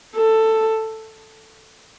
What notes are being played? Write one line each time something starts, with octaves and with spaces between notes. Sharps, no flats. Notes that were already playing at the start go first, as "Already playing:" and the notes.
A4